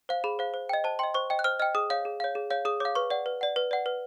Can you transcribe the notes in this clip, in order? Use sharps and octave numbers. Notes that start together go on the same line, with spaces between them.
C5 F5
G#4 B5
C5 F5
C5
D#5 G5
C5 A5
D#5 G5 C6
C5 C#6
D#5 G5
F#6
C5 F6
D#5 G5 F6
G#4 D#6
C#5 F5
G#4
C#5 F5
G#4
C#5 F5
G#4 D#6
C#5 F5 D6
B4 C#6
D5 F#5
B4
D5 F#5
B4
D5 F#5
B4